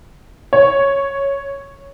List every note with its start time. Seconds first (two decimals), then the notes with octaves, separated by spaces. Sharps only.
0.53 C#5